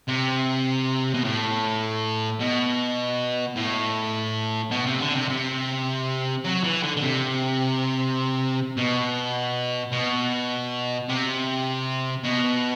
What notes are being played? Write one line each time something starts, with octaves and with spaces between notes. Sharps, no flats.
C3
B2
A2
B2
A2
B2
C3
D3
C3
C3
F#3
E3
D3
D3
C3
B2
B2
C3
B2